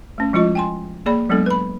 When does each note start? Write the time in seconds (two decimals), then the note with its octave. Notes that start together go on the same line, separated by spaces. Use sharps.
0.18 A3 C#4
0.33 F3 G#3 E4 F4 D#5
0.55 G5 G#5 C6
1.06 A#3 G#4 D5 B5
1.29 F#3 G#3 B3 D4 A4
1.46 B4 B5